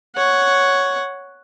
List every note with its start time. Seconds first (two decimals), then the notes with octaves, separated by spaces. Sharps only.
0.16 C#5 F#5